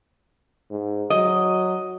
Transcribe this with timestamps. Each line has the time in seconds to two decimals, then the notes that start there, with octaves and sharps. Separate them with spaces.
0.71 G#2
1.10 F#3 D#5